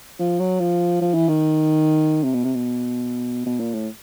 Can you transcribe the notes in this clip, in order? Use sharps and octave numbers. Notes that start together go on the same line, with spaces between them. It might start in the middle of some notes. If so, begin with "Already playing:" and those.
F3
F#3
F3
F3
E3
D#3
C3
B2
C3
B2
B2
A#2
A2